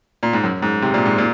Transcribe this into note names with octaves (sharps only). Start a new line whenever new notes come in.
A#2
G#2
F#2
G#2
C3
A#2
G#2
A#2